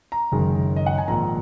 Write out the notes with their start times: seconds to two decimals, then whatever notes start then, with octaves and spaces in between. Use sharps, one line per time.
0.12 A#5
0.32 F#1 F#2 D#3 G#3
0.76 D#5
0.86 F#5
0.98 G#5
1.08 A#1 G#2 D#3 A#3 A#5